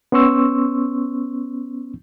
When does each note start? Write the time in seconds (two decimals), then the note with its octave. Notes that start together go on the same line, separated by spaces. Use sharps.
0.12 B3 C#4 C6 C#6 E6